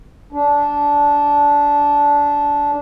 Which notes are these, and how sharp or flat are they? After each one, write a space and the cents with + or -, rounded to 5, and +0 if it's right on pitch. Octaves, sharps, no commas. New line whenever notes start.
D4 -15